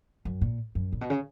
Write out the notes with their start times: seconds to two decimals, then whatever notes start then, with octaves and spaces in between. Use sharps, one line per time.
0.25 F#2
0.41 A#2
0.75 F#2
0.92 A#2
1.01 B2
1.10 C#3